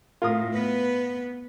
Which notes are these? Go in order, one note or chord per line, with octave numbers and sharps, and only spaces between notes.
A2 F4 A#4 D#6
B3 B4